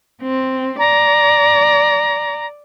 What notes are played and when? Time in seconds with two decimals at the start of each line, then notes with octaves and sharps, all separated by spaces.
0.22 C4
0.79 D5 A#5